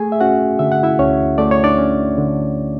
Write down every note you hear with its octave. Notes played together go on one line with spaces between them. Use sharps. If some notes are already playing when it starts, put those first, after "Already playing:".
Already playing: A3 G#4 G#5
E5
C#4 F#4 F#5
D3 E5
F#5
E4 E5
D2 C#4 C#5
A3 D5
C#5
D4 D5
C#4
D3